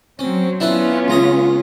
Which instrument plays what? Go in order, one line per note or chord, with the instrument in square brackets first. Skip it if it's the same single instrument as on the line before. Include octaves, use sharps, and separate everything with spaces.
[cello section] F#3 C4 [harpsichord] C#4
[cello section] B3 C#4 F4 [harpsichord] D4 E4 B4
[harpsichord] C#2 A#5 D#6